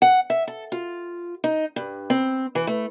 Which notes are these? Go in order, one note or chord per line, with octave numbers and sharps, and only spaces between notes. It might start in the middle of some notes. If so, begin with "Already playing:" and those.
F#5
E5
A4
F4
D#4
G2
C4
E3
A3